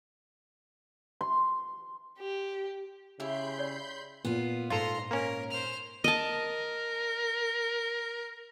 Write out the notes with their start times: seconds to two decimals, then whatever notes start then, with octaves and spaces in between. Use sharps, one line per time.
1.21 C6
2.19 G4
3.20 C#3 E4 G4 E5 B5 C6 G6
3.59 C#5 D5
4.25 A#2 B3 F4
4.70 G#2 F4 A4 A#5 C6
5.11 A#3 C#4 A#4
5.50 C5 F6
6.04 A#4 D#5 A5